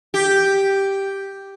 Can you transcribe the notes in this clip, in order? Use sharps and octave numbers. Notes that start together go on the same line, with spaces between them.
G4